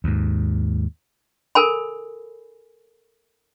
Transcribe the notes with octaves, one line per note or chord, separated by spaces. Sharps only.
D#2 G#2
A4 A#4 G#5 B5